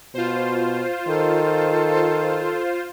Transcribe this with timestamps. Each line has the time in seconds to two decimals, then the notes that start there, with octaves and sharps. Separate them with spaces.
0.14 B2 F4 C5
1.08 D#3 A4